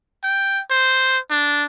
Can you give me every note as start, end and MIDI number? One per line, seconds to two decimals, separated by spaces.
0.24 0.61 79
0.70 1.18 72
1.30 1.66 62